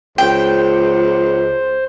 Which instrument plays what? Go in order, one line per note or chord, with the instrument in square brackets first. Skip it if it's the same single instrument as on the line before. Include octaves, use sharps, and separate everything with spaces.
[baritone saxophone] C#2 [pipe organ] C5 [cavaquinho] G5